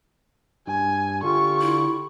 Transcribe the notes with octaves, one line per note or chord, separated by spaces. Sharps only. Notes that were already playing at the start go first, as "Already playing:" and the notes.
G2 G#5
D3 F4 G4 C#6
E4